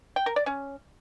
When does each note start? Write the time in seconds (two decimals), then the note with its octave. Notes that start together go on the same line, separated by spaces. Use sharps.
0.16 G5
0.26 A#4
0.36 D5
0.46 C#4